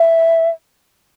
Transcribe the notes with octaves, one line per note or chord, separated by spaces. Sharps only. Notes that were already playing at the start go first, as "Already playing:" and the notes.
Already playing: E5